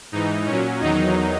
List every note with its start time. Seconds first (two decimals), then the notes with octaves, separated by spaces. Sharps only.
0.12 G#2 E3 D#4
0.46 A#2 C#4
0.51 F#3
0.81 E2 D#3 F#3 D#4